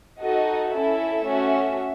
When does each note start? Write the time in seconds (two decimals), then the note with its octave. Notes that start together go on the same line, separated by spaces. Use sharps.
0.22 D#4 F#4 A4 D#5
0.73 C#4 E4 A4 E5
1.25 A3 C#4 F#4